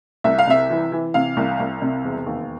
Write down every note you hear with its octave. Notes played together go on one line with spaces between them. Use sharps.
C2 E5
F5
C3 E5
E3
E3
C3 F5
C2
C2
C3
E1
D#2